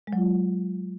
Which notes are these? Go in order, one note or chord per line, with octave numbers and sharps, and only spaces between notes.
G#3
F#3
F4